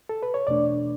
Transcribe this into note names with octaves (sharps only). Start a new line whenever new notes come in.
A4
B4
C#5
E2 B2 A3 D4 D5